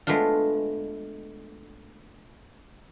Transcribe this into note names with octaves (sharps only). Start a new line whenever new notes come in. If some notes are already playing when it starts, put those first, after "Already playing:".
G#3 A3 B3 D4 F4